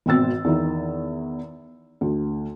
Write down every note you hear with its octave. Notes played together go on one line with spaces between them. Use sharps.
G#1 B2 C4 E6 A6
E2 D#3 E3
D2